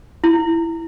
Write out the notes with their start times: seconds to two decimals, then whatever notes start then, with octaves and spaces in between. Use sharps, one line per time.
0.24 E4